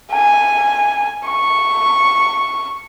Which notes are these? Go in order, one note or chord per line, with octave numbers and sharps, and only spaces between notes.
G#5
C#6